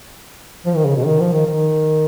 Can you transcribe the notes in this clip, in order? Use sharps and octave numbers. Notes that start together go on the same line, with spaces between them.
F3
D#3
C#3
B2
D#3
F3
D#3
D#3